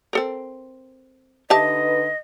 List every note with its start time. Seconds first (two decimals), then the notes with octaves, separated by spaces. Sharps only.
0.13 C4 A4 A#4
1.50 D3 D#4 G4 B4 D#5 E5 A5